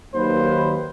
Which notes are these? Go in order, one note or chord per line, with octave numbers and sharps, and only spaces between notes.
D#2 D#3 F#3 A#3 B4 C5